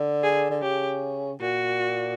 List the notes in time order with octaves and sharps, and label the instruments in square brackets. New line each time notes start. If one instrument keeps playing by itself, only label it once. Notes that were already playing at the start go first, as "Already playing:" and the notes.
Already playing: [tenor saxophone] D3
[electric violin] G#4
[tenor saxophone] D3
[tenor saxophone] C#3 [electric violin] G4
[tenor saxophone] A#2 [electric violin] F#4